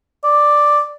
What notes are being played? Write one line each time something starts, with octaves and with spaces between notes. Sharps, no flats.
D5